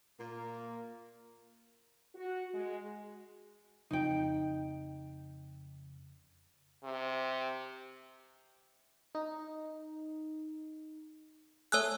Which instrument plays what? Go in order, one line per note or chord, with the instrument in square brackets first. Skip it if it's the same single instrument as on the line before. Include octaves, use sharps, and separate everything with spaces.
[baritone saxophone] A#2 [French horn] A#3
[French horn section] F#4
G#3
[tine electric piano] F2 C#3 [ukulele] D#4 G5
[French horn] C3
[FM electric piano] D#4
[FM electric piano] A3 G#4 [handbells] C#5 E6 F#6